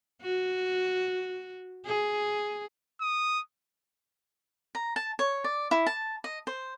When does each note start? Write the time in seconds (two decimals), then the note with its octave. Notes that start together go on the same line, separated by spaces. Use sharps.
0.22 F#4
1.86 G#4
3.01 D#6
4.75 A#5
4.96 A5
5.19 C#5
5.44 D5
5.71 E4
5.86 A5
6.24 D#5
6.47 C5